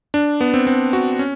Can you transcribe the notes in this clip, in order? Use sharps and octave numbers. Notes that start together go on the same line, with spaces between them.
D4
B3
C4
C4
F#4
C#4